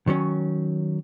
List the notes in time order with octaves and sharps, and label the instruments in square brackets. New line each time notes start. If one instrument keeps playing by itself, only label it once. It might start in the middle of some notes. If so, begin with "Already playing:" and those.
[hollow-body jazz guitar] D#3 F#3 C#4